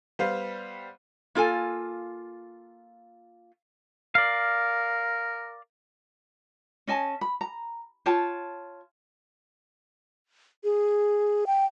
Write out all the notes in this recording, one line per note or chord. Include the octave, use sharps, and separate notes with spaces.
G3 B3 C5 F5
A#3 F4 A4 G#5
A#4 D5 F5
C#4 D#5 G#5 A5
B5
A#5
F4 C#5 G5 A5
G#4
G5